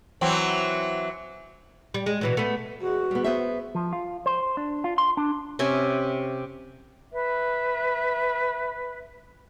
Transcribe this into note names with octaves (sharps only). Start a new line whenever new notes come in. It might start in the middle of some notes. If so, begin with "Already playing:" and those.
E3 F#3 C4
G3
G#3
B2 E3 F#3
A3 B3
E2 G#3 F#4
G3 B3
B3 C5 E5
F3
F4
C5
D4
F4
C6
D4
C3 C#4 E5 G#5
B4 E5